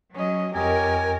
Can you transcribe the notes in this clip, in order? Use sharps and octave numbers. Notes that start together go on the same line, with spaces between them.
F#3 C#4 D#5
F2 G4 A#4 C#5 D#5 G#5